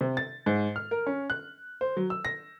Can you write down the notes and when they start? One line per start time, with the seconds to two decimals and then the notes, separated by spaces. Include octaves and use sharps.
0.01 C3
0.17 A6
0.46 G#2
0.76 F6
0.91 A#4
1.07 C#4
1.30 F#6
1.81 C5
1.97 F#3
2.10 E6
2.25 A#6